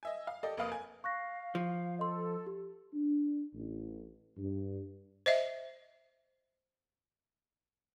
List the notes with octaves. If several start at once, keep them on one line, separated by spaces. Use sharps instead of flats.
D#5 E5 G#5
F5
G4 A4 D5 D#5
F1 A#3 B4 F5 D#6 F6
G#5
F5 C#6 F#6 A#6
F3
A4 D#5 C6
G4
D4
A1
G2
C5 D#5 E5